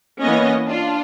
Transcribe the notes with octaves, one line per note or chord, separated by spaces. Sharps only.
E3 A#3 B3 C#4 C#5 D#5
D4 F4